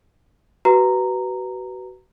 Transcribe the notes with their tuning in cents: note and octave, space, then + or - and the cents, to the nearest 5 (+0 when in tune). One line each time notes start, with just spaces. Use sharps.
F#4 +30 B4 +0 A#5 -10